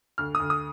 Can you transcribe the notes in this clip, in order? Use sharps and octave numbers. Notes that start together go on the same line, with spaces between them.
D2 F6
D#6
D2
D#6